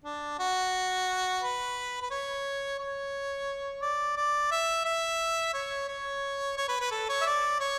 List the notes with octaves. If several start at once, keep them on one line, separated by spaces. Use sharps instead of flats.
D4
F#4
B4
B4
C#5
C#5
D5
D5
E5
E5
C#5
C#5
C#5
B4
B4
A4
C#5
E5
D5
C#5